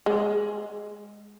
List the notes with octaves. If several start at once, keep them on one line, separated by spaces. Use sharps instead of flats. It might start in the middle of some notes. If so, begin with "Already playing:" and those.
G#3